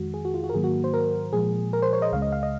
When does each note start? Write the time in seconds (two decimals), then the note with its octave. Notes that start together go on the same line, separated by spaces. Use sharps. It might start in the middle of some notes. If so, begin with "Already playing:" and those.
Already playing: F2 D#3 G#3 F#4
0.14 G#4
0.25 F#4
0.34 F4
0.44 F#4
0.49 A#4
0.54 G#2 D#3 F#3 A#3 G#4
0.64 F#4
0.84 C5
0.94 A#4
1.33 A#2 F3 G#3 G#4
1.73 A#4
1.82 C5
1.93 C#5
2.02 D#5
2.12 C#2 C#3 G#3 F5
2.22 D#5
2.32 F5
2.43 D#5